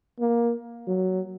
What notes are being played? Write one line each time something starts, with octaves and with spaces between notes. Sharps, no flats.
A#3
F#3